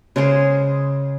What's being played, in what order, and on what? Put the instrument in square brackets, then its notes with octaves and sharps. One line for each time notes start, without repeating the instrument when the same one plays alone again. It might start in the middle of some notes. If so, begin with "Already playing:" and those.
[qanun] C#3 G#3 G#4 C5